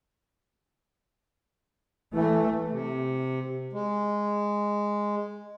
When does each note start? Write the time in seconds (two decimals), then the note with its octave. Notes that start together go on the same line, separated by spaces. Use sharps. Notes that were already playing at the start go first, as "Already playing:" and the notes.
2.14 E3 A3
2.71 C3
3.73 G#3